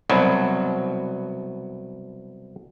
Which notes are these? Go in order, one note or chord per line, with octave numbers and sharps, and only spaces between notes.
C2 B2 F#3